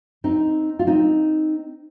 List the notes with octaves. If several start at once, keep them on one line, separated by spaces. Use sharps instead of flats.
C4 D#4
F4
C4 D#4